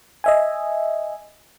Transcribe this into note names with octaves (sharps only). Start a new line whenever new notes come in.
D#5 E5 G#5